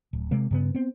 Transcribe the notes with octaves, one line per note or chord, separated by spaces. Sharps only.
D1
C3 G#3 A#3
G2 C#3 B3
B3 C4